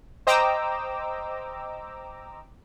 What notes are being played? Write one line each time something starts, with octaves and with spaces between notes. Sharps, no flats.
C5 D#5 G5 A#5 D6 E6